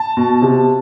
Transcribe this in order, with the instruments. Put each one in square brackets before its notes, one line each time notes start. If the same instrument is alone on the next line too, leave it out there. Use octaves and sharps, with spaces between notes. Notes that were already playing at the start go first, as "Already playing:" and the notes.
Already playing: [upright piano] A5
B2
C3